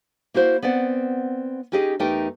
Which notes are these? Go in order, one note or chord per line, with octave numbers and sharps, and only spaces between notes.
A#3 E4 F#4 C5
B3 C4 D5 F#5
C#4 D#4 G4 G#4 D#5
E2 A3 D#4 G4 A#4 G5